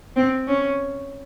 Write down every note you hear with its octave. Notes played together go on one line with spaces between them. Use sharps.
C4
C#4